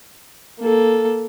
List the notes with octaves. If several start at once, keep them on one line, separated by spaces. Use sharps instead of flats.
A#3 A4